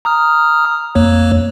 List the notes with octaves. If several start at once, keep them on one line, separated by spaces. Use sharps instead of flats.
A#5 D#6 F6
F2 A#3 C#5